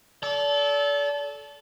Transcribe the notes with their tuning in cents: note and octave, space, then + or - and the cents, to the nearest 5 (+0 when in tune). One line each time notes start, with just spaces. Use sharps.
A4 -20 D5 -35